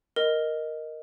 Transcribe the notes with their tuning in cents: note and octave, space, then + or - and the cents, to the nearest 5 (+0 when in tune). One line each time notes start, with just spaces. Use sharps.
A#4 +0 D#5 +0